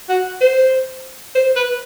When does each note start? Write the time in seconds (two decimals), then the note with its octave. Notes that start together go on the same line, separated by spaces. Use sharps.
0.09 F#4
0.41 C5
1.35 C5
1.56 B4